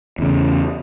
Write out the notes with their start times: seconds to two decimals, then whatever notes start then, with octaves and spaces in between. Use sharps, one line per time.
0.19 E2 C#3